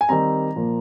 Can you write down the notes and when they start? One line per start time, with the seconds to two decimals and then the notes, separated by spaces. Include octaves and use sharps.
0.01 G#5
0.09 D#3 G3 C4 A#5
0.56 A#2 F3 A#3